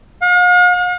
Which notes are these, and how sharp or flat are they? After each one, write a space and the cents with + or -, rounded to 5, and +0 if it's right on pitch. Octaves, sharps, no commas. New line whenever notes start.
F5 +45